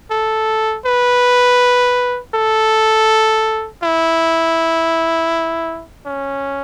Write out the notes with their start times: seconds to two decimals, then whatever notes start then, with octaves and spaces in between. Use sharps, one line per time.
0.11 A4
0.86 B4
2.34 A4
3.83 E4
6.06 C#4